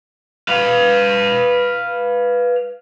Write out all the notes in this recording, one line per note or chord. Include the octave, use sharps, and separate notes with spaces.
B4 F5